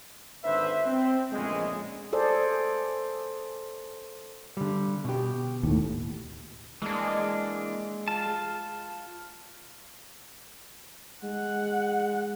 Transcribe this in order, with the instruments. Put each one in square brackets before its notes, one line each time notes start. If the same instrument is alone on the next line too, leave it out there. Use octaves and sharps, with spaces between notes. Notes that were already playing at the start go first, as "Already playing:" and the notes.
[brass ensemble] G#1 D3 B4 C5 E5
C4
A#1 E2 A2 C#3 G#3
[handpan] G#4 A4 C5 D5
[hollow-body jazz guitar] D3 G3
B2 G4
[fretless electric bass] D#2 A2
[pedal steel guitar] E3 A#3 D4 [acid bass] G#3
[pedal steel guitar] F4 A5
[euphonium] G#3 [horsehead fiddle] F#5